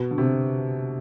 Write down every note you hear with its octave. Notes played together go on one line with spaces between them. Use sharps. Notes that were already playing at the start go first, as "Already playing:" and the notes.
Already playing: B2
D3
C3